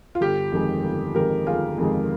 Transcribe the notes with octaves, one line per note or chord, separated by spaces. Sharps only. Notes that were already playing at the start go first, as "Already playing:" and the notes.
F4
G1 G4
F2 D#3 G#3
G1
F2 D#3 G#3 G4 A#4
G1 F4 G#4
F2 D#3 G#3